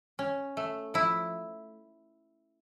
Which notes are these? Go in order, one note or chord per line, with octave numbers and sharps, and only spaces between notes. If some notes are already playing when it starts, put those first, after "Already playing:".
C#4
A3
F3 E4